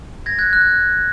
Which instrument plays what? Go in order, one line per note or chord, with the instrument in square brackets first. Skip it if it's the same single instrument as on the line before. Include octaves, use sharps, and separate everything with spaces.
[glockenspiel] G#6 A#6
F#6 G#6
F#6